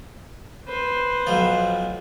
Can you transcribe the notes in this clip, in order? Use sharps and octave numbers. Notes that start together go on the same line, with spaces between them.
B4 C5
B1 F3